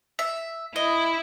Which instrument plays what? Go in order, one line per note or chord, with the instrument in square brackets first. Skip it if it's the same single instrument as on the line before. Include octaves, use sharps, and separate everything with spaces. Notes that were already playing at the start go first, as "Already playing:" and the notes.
[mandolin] E5
[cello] E4 [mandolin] D#5